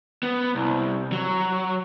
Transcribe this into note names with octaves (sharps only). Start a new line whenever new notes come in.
B3
C2
F#3